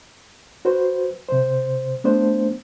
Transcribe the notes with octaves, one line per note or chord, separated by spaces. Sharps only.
F#4 B4 C5
C3 C5
A3 B3 D4 C5